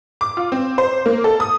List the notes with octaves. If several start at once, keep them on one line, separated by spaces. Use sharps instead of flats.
D6
F4
C4
C5
A#3
A4
D#6